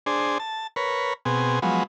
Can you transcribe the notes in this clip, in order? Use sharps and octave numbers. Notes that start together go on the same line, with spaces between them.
D4 G#4 C5
A5
A#4 B4 C#5
B2 C4 G#4
F3 F#3 G#3 B3